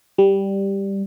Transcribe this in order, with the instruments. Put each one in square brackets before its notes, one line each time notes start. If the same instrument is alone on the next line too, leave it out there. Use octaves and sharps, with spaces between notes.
[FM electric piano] G3